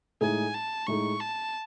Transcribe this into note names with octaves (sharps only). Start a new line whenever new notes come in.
A2 G#3 D#4 G#4 G#5
A5
A2 G#3 D#4 G#4 C#6
A5